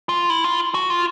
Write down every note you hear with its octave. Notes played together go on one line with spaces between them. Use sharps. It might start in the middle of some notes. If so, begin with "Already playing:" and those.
F4
E4
F4
F#4
F4